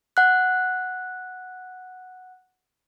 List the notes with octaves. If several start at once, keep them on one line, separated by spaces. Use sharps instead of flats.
F#5 F#6